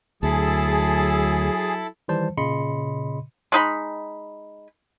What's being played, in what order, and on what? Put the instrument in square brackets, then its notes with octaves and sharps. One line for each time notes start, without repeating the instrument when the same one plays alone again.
[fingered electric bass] D2 [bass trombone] F#3 [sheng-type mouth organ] E4 A4 A5 [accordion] G#4
[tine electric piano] D#3 E3 G3 C5 A5
A#2 C#3 D#5 B5 C6 C#7
[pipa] G#3 D#4 B5